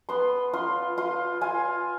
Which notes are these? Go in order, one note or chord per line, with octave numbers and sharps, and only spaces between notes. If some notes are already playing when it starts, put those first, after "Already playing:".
B3 C6
F4 C6
F4 C6
F4 G#5